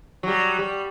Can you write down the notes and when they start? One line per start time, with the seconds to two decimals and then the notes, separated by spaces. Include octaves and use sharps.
0.23 F#3 G3
0.59 G3